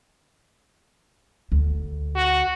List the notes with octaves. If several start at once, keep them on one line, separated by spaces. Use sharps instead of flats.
D2
F#4